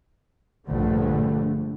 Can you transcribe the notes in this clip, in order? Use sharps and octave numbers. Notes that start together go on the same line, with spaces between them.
A#1 G2 D3 A3